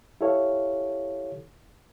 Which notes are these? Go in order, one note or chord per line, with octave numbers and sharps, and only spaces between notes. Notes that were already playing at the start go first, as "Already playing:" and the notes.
E4 G4 A4 C#5 F5